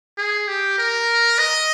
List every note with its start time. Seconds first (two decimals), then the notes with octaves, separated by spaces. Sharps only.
0.18 G#4
0.48 G4
0.78 A#4
1.39 D#5